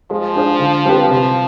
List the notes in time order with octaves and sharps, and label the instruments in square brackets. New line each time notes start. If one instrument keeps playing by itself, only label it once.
[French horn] F3 [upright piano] G#3
[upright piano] D4 G#4 C5 F5
D3
G3 C4 G4 B4
[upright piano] C3 [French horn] F3